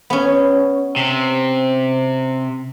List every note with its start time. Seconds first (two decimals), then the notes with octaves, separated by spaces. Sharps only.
0.10 B3 C#4
0.96 C3